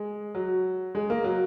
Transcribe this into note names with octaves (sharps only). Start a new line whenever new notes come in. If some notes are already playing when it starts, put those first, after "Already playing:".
Already playing: G#3
F#3
G#3
A#3
F#3